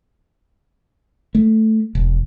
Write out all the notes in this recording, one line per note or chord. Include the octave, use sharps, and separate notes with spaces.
A3
E1